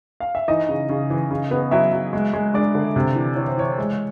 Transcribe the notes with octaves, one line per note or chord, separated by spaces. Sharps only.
F5
E5
E3 D#4 D#5
C#3
C#3
E3
C#3
B3
F#3 E4 E5
F#3
G#3
G#3
G#3 D4 D5
D3
C3
E3
E3 C#5
C5
E3 C#5
G#3